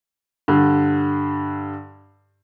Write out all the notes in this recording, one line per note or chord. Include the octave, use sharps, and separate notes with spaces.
G2 D3